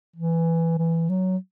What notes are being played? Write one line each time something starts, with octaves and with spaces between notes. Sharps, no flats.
E3
E3
F#3